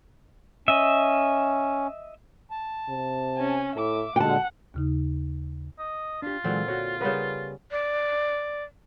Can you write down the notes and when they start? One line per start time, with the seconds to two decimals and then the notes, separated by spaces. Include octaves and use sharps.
0.68 C#4 D#5 E5
2.51 A5
2.89 C3
3.37 C#4 G#5
3.76 A2 E5 D6
4.16 A#2 D3 G#3 F#4 F#5 G5 A5
4.74 D#2 C#3 D#4
5.79 D#5
6.22 D4 F4 G4
6.44 A#2 D3 E3 F#3 G#3 C4
6.68 F#4 C#5
7.01 C#3 G3 B3 A#4 B4 B5
7.71 D5